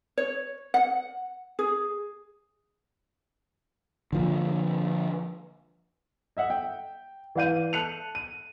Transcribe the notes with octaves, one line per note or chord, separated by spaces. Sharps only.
C#5
F#5
G#4
D3 F3 A#3
D#5 E5 F#5
G5
E3 D5 F5 G6 D#7
A5 F#6 C#7 D#7 F7
D#7